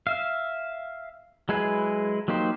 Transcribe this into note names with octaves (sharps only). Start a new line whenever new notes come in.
E5 F5
F#3 G#3 E4 G#4 B4
F#3 A#3 D#4 G4 C5